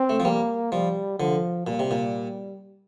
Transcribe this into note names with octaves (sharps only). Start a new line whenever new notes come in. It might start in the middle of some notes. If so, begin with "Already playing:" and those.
Already playing: C4
A3
F3
G3 A#3
F3 G3
D3 F3
A#2 G3
C3
A#2